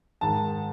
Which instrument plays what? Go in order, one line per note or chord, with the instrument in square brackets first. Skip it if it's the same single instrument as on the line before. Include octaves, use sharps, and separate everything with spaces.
[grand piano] G#2 D#3 A5